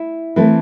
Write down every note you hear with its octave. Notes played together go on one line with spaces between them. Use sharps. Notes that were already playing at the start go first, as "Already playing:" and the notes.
Already playing: E4
E3 A3 C4